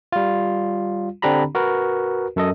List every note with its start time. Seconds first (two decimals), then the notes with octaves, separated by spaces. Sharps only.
0.12 G3 F4
1.22 D3 C4 D4 G4 A#5 B5
1.55 F#4 A#4 B4
2.36 F#2 A4 D#5